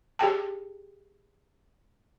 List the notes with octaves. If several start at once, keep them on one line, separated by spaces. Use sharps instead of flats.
G4 G#4 G5 A5